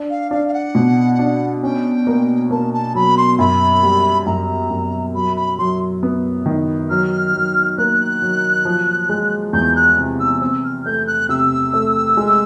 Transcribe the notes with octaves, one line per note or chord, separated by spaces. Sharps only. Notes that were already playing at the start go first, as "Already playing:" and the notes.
Already playing: D4
F5
D4 F5
F5
F#5
B2
D4
C#4 G5
A#3
A#3 A5
A5
F#3 B5
C6
F#2 B5
G3
F#2 A#5
F#2
F#3 B5
B5
F#3 C6
B3
D#3
F#3 F6
F#3
A#3 F#6
F#3
F3
G#3
E2 G6
F#6
C3
E6
C4 E6
F6
A3 G6
F#6
C3 E6
A3
G#3